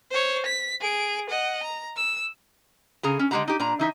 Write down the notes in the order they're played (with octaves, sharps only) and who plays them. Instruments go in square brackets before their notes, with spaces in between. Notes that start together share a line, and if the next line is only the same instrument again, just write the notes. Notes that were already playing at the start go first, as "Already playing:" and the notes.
[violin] C5 C#5
B6
G#4 D7
D#5 F#5
A#5
E6
[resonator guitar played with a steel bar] C#3 G#4 A#5
C#4
D3 G#3 D4 G4 F#5 A#5
D#4 G4
A#2 D4 A#5
E3 D#4 E5